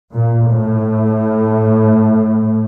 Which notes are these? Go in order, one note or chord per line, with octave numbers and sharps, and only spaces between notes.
A#2
A2